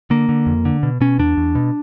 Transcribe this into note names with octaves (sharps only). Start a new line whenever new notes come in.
D3 A#3
D3
F2
D3
B2
B2 C#4
E2 D4
E2
B2